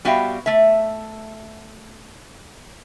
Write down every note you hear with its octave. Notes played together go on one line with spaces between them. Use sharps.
G3 B3 F#4 E5 F5 G5
A3 E5